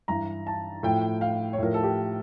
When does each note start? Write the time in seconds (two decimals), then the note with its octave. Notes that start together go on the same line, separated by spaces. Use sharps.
0.08 G2 E3 A#5
0.47 A5
0.83 A2 F3 G5
1.21 F5
1.53 C#5
1.58 A2 F3 A#4
1.74 A4
1.83 G4